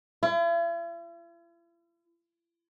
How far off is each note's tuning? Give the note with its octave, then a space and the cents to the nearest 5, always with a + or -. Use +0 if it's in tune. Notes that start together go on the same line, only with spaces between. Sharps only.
E4 +45